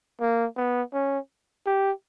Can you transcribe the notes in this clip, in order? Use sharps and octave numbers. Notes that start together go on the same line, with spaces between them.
A#3
B3
C#4
G4